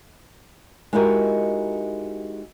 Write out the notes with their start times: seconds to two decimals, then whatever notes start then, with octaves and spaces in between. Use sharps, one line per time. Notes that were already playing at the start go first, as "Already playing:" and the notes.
0.93 G#3 D#4 E4 F#4 G4 A#4